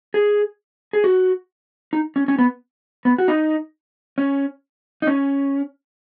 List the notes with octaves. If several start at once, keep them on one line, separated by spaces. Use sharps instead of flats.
G#4
G#4
F#4
D#4
C#4
C#4
B3
B3
F#4
D#4
C#4
D#4
C#4